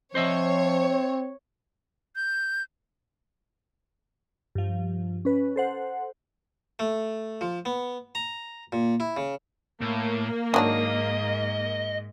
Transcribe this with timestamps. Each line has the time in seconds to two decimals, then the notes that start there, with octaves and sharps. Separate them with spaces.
0.15 F3 C4 C5 C#5 D#5 E5
2.16 G6
4.55 G2 F3
5.25 C#4 B4
5.56 A4 C5 F#5
6.79 A3
7.41 F3
7.65 B3
8.15 A#5
8.72 A#2
9.00 E4
9.17 C#3
9.81 A2 A#3
10.54 G#2 D#3 F#3 D4 D#5